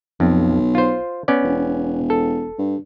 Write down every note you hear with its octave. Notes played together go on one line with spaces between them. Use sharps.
B1 F2
F4 C5
B3 C#4 D5
E1
A4
G2